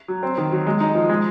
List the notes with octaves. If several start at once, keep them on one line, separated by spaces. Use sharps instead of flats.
F#3
C4
D#3
F#3
G#3
D#4
F3
G#3